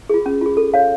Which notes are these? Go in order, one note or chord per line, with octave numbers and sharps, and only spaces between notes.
F4 G#4
C#4
F4 G#4
A4
C#5 F5